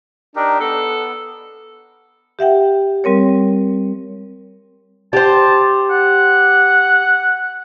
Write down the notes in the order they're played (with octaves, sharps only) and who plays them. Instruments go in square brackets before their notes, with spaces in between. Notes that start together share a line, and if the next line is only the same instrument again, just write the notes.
[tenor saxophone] D4 [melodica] D#4 G4 A#4
[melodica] B3 [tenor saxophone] A4
[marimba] G4 E5 F#5 G5
G3 C4 A#4 C#5
[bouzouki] G4 C5 [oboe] A5
[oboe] F#5